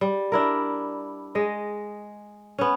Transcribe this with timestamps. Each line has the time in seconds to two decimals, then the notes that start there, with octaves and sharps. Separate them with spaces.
0.01 G3
0.32 D4 E4 A#4
1.35 G#3 D#5
2.58 B3 C#4